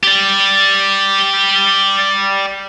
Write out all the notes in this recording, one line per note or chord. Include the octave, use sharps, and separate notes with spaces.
G4 D5